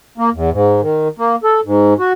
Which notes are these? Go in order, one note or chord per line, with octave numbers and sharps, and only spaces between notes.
A#3
E2
G#2
D#3
A#3
A4
G#2
F#4